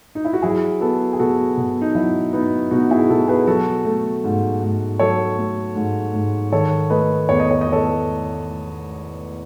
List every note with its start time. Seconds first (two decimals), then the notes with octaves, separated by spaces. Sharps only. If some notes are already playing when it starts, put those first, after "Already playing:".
0.15 D#4
0.25 E4
0.33 F#4
0.42 F#3 E4 G#4
0.80 B3 F#4 A4
1.13 G#4
1.19 B2 F#4 A4
1.57 B2
1.81 D#4
1.95 F#3 E4
2.33 B3 D#4
2.71 B2 D#4 F#4
2.90 E4 G#4
3.09 B2 F#4 A4
3.28 G#4 B4
3.47 F#3 F#4 A4
3.85 A3
4.24 G#2
4.62 G#2
4.99 F#3 A4 C#5
5.38 A3
5.75 G#2
6.14 G#2
6.52 D#3 A4 C#5
6.90 A3 B4 D#5
7.29 E2 C#5
7.40 D#5
7.51 C#5
7.61 D#5
7.66 E2
7.72 A4 C#5